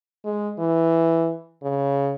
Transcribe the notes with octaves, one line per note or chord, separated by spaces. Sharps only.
G#3
E3
C#3